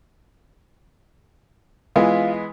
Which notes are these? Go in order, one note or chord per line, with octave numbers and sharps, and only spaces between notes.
E3 G#3 B3 F4